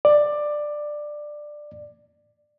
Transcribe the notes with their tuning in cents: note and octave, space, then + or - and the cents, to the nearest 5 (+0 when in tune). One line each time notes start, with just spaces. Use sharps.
D5 +15